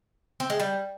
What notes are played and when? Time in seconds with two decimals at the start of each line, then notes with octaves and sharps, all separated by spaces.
0.40 C4
0.50 G#3
0.60 G3